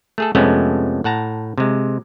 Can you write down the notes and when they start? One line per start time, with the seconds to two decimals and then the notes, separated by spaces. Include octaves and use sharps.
0.18 A3 G#4 A4
0.35 F2 C3 G#3 A3 B3 C#4
1.04 A2 F#5 A5 A#5
1.58 C3 G#3